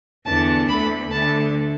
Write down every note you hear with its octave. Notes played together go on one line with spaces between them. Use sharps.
E2 D3 B3 D4 A5
D2 D3 A3 B5
D2 D3 A3 A5